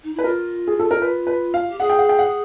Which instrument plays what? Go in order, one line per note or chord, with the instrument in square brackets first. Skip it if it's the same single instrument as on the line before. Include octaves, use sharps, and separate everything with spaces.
[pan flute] D#4
[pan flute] E4 [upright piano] B4
[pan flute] F4 [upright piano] A#4
[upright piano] G#4
A4
A#4
B4
B4
F5
[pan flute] G4
[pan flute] G#4 [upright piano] F#5
[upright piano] G5
F#5
G5
F#5